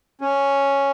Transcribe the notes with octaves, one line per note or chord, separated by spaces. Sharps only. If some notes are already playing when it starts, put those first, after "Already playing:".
C#4